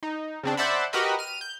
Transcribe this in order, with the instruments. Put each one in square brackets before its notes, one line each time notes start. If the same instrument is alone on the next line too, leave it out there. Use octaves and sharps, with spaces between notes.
[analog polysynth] D#4
C#3 C4 D4
C5 D5 E5 F#5 A5 B5
F#4 G4 A#4 B4 D#5 B5
F6 D#7
G6